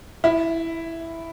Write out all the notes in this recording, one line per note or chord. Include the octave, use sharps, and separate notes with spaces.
E4